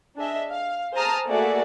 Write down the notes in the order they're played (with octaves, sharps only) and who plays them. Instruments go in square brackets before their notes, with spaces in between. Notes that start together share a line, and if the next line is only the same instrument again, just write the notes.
[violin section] D4 G#4 D#5 E5
F5
G#4 C5 A5 A#5 D#6 F6
A3 A#3 F#4 G#4 D5 E5